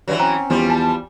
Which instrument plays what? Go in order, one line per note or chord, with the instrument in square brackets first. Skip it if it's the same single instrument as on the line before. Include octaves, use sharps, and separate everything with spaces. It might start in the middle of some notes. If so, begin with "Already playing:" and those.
[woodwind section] G2 [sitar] E3 F#3
[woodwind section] C4 C#4 [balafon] A#5
[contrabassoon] E2 [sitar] F3 G3
[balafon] G#5 [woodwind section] A5